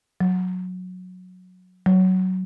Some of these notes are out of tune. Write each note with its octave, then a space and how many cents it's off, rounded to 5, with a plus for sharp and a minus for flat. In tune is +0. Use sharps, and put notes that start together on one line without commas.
F#3 -15
F#3 +10